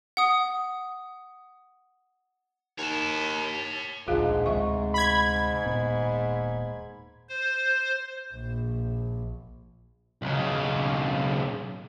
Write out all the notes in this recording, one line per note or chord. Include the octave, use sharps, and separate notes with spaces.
F#5 D#6
D#2 C#5 A5
D1 A#1 G#2 D3 F4 G#4 F5
D2 C3 G#3 E5 C#6
B5 G#6
D#1 A#2 B3
C5
A#1
B1 C#3